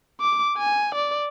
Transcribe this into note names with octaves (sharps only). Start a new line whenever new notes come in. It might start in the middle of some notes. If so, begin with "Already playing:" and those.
D6
G#5
D5